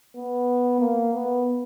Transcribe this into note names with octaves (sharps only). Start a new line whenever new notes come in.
B3
A#3
B3